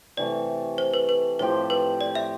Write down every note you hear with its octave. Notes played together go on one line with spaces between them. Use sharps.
C3 E3 A3 D5
C5
B4
B4
A2 F3 C4 G4 C5
B4
D5
E5